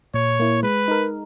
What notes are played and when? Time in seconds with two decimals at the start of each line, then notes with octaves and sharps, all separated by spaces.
0.14 A#2 C#5
0.40 A#3 E4
0.63 G#3 B4
0.88 D#4 A#4